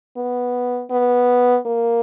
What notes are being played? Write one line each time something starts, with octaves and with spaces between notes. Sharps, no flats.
B3
B3
A#3